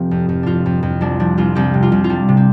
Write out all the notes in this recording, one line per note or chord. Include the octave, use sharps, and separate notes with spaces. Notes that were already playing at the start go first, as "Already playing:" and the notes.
Already playing: F1 C3 F3 G4
F2
F2
F2 D4 F4
F2
F2
C2 D4
F3 D4
C2 F4
C2 G4
C3
F4
C2
F4
G3 D4
C3
C4